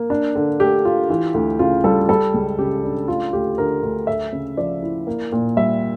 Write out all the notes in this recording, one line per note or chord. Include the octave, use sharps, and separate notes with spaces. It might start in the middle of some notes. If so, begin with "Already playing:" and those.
Already playing: A#3
D4
D3
A3 G4
F4
E3
D2
C#3 F4
G3 A4
G3 A4
C#2
C#3 G4
D4
A3 F4
D2 G4
D3 A#4
D2
A3 E5
C#3
F3 D5
E4
A#3
A#2
G3 E5